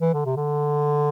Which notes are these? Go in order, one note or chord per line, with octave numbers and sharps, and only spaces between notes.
E3
D3
C3
D3